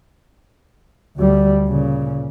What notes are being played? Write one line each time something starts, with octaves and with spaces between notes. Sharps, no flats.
D2 G3
A#2 C#3